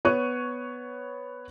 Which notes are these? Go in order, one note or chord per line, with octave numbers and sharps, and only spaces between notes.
B3 C#5 C#6 F#6 D#7